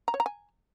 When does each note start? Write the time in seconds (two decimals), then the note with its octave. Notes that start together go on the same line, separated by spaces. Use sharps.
0.08 A#5
0.14 C#5
0.20 A#5
0.26 G#5